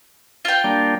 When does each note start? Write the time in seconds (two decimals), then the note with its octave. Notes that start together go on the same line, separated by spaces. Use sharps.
0.45 F4 G5
0.64 G3 A#3 D4